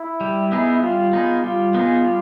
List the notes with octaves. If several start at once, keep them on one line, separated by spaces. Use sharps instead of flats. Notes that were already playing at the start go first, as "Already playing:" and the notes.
Already playing: E4
G3
B3 D#4 G#4
G3 F4
B3 D#4 G#4
G3 F4
B3 D#4 G#4
G3